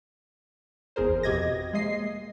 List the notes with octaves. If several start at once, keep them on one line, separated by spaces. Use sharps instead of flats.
G#1 E2 G#4 A#4 C5
F2 B2 G4 D#5 G#6 A#6
G#3 A#3 D#5 C7